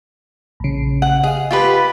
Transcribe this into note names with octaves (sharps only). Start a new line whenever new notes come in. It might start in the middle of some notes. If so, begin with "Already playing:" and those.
A#1 C#3
F#5
G#4 D#5 F5
F4 G4 B4